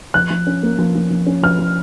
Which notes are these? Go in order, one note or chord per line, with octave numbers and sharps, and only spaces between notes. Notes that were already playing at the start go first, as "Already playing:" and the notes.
F3 F#6
F3
C#4
A#3
F3
F3
F3
C#4
F3 F6
F3